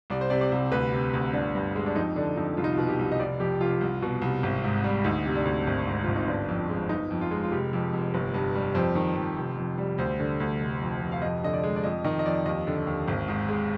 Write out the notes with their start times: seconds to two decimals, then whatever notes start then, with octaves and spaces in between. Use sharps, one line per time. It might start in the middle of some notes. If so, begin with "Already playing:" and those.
0.10 C2 D5
0.21 C5
0.30 C3 D5
0.41 D5
0.52 C2
0.72 D2 B4
0.92 C3
1.14 D2
1.33 G1 D4
1.55 G2
1.75 G#3
1.86 D4
1.96 F2 D#4
2.16 D3 D4
2.37 F2 D#4
2.57 C2 F4
2.64 D#4
2.72 F4
2.77 B2
2.88 G4
2.99 C2
3.12 D#5
3.19 F1 D5
3.39 F2 G4
3.60 F1 F4
3.81 C2
4.02 B2
4.22 C2
4.43 G#1
4.64 G#2
4.84 G3
5.04 D2 D#4
5.26 C3
5.35 D4
5.45 D2
5.67 G#1
5.87 G#2
6.03 G#1 F4
6.16 D#4
6.28 G1 D4
6.48 F2
6.69 G#3
6.89 G1 D#4
7.11 F2
7.21 F4
7.31 G#3
7.43 F4
7.51 F1 G4
7.73 F2
7.93 F1
8.14 G1
8.34 G2
8.55 G3
8.75 F2 C5
8.95 D#3
9.17 F2
9.36 F1
9.57 F2
9.78 G3
9.98 D2 C5
10.20 D3
10.40 D2
10.60 F1
10.82 F2
11.02 F1
11.11 F5
11.22 F2 D#5
11.43 D3 D#5
11.53 D5
11.63 G#3
11.76 D5
11.83 F2 D#5
12.04 D#3 D#5
12.19 D#5
12.25 F2 D5
12.46 D#2 D#5
12.67 D3
12.87 D#2
13.08 G#1
13.28 G#2
13.49 G#3